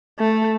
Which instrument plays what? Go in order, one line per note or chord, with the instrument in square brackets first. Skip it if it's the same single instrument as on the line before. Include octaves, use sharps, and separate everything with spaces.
[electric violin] A3